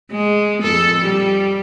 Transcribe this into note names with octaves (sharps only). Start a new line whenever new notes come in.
G#3
F2 A4
G3